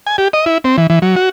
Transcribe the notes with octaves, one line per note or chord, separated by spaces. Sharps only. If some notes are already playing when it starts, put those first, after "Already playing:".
G#5
G4
D#5
E4
C4
E3
E3
F#3
F#4